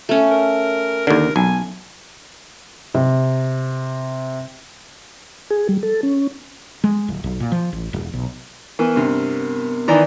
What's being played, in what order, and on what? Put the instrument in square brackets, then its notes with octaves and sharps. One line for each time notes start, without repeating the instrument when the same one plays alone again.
[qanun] A3 C#4
[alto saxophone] A#4
[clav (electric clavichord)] D#2 D3 [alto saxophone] A#4
[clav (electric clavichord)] B1 [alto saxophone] G#5
[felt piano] C3
[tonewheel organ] G#4
G3
A4
C#4
[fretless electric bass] G#3
D1
B1
A#2
F3
A1
E1
B1
[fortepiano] E3 [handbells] B3 A#4
[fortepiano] G2 C3
[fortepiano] D#3 E3 A#5 [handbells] E4 D5